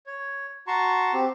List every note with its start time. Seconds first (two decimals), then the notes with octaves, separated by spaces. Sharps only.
0.06 C#5
0.67 F#4 A5 A#5 C6 C#6
1.13 C4 G4